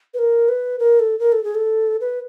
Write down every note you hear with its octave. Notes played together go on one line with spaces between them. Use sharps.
B4
A#4
B4
A#4
A4
A#4
A4
G#4
A4
B4